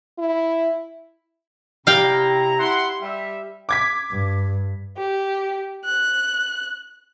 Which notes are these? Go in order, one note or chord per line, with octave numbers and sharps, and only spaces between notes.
E4
C3 E4 G4 D5 F5 G5 A#5
E4 F#5 C6
G3 E5
D6 G#6 B6
G2
G4
F#6